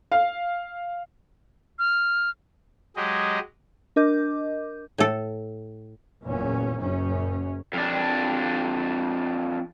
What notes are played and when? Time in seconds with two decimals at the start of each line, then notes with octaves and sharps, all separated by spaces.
0.12 F5
1.79 F6
2.96 F#3 G#3 G4 D#5
3.96 D4 A#4 D#5 D6 G6
4.98 A2 A4
6.24 F#1 E2 A#2 C#4
6.76 F#1 F#2 C#4
7.73 F2 D4